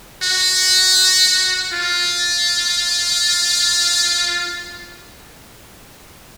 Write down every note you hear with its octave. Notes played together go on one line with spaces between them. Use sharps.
F#4
F4